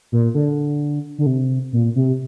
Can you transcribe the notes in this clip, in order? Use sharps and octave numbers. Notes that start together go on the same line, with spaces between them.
A#2
D3
D3
C3
A#2
C3